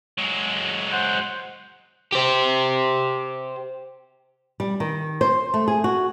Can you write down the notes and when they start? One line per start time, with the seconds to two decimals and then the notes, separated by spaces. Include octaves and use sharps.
0.18 F#3 G#3
0.92 C5 F#5
2.12 G4 C5
4.60 G3
4.80 D#3
5.21 C5
5.54 A3
5.68 G#4
5.84 F#4